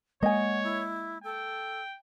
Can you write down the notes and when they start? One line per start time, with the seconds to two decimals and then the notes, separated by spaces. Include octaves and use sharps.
0.23 G#3 A#3 C#5 D#5 F#5 G#5
0.63 E4
1.24 A4 G5